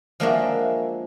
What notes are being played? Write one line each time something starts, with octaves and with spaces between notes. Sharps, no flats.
F3 G#3 A#3 D4 F#4 E5